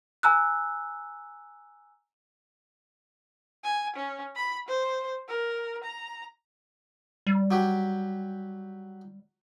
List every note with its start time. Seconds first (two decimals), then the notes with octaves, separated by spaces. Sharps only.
0.23 G#5 A#5 E6 F#6
3.64 G#5
3.96 C#4
4.36 B5
4.68 C5
5.29 A#4
5.84 A#5
7.27 G3
7.51 F#3 G4